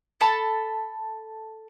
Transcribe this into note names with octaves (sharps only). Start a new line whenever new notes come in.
A4 A5 B5